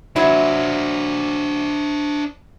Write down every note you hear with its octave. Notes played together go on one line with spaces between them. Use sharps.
F#3 D4 E4 C5